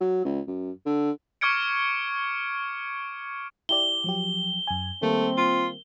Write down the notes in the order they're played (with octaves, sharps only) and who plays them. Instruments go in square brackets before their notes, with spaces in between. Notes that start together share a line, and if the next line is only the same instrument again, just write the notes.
[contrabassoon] F#3
C#2
F#2
D3
[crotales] C#6 D6 F6 G#6 C#7 D7
[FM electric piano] E4 G4 D5 [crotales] G7
[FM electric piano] F3 F#3 G4
F#2 G#5
[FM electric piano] D#3 G3 A#3 [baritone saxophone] A3 [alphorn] C4
[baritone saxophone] F4